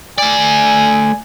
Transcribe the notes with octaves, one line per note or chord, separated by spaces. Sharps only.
A3 D5 G#5